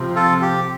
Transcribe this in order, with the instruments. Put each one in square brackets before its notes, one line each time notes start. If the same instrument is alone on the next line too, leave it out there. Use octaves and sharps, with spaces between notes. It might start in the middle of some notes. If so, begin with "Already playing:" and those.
Already playing: [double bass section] C3 F3 C4
[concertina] F4 A4
G4